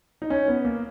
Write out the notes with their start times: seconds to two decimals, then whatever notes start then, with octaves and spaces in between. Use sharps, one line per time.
0.22 D#4
0.30 C#4
0.48 B3
0.65 A#3